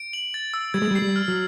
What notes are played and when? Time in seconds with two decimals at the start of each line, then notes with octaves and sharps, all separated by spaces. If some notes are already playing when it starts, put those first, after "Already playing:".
Already playing: D7
0.13 F#7
0.34 A6
0.54 E6
0.74 G3 G#6
0.82 G#3
0.91 G3
0.95 C7
1.02 G3
1.16 F6
1.28 F#3